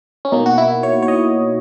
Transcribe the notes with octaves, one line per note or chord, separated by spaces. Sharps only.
C#4
B2 A#3 D#4
F#4
E4
C#5
C#5
D#5